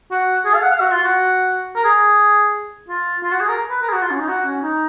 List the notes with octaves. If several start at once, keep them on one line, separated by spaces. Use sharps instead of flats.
F#4
G#4
F5
F#5
F5
F#4
F4
F#4
A#4
G#4
F4
F4
F#4
G#4
A#4
B4
A#4
G#4
F#4
F4
C#4
D#4
F#4
C#4
D#4